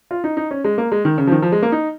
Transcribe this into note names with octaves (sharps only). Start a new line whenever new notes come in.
F4
D#4
D#4
C#4
G#3
A#3
G#3
D#3
C#3
F3
D#3
F3
G#3
A#3
D#4